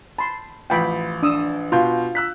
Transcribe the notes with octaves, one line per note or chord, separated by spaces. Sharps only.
A5 B5 C6
A1 F3 G5 B5
D4 D#6 E6
B2 F4 C6 G6
E6 F#6 B6